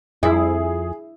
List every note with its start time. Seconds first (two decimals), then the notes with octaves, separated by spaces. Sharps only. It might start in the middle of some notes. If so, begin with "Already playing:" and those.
0.23 F2 E4 G#4